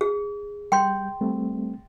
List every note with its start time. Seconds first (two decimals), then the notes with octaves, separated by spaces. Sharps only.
0.01 G#4
0.72 G3 G5 C6 G6
1.21 G3 A3 C4